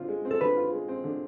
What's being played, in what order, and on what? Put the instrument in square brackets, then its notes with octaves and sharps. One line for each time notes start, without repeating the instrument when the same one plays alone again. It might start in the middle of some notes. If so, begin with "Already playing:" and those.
Already playing: [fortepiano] D3 C4 F4
G#3
C4
[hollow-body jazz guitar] A4
[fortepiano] D3 [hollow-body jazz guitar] B4
[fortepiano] F4
G#3
C4
D3